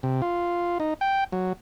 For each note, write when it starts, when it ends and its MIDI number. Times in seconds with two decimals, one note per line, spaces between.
0.03 0.21 48
0.22 0.78 65
0.80 0.94 63
1.01 1.24 79
1.32 1.53 54